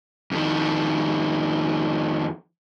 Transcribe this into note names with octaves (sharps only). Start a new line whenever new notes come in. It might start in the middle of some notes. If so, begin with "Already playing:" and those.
F2 D#3